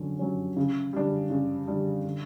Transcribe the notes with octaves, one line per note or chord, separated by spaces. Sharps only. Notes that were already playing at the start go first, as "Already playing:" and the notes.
Already playing: D3 F#3 C#4
F#3 C#4
C#3
G3 D4
C#3
G3 D4
D3